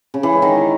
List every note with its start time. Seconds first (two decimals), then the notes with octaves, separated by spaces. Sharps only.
0.14 C#3
0.23 E3
0.33 G#3
0.42 D#3